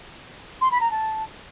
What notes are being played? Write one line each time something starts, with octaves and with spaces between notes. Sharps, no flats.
C6
B5
A#5
A5